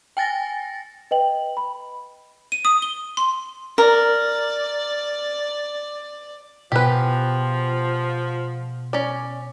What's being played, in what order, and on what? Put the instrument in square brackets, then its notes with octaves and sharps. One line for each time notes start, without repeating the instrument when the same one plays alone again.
[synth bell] G5 G#5 A6 A#6
[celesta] B4 D#5 G5 F#7
B5
[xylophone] D#7
D#6
G7
C6
[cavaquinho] A#4 [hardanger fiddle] D5
[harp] B2 G#4 G5 [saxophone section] F3 [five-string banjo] G4 B4
[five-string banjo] C#4 D5